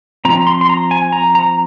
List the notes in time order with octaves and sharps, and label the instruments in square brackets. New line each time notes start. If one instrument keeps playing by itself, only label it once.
[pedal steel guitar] F3 C4 A#5
C6
C6
A#5
G#5
A#5
A#5